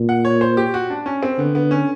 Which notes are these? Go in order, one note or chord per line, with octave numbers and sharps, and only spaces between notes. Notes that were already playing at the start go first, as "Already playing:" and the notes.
Already playing: A#2
F#5
C#5
C5
G4
F#4
D4
C#4
C4
D3 B3
B3
C#4